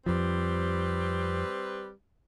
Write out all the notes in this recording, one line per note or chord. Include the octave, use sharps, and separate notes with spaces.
F2 F3 G3 C4 B4